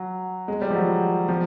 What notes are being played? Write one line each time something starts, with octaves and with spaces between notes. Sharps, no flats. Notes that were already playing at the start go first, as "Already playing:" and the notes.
Already playing: F#3
G#3
G3
F3
F#3
F3